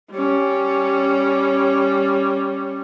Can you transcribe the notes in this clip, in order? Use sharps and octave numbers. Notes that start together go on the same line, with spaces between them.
G3 C#4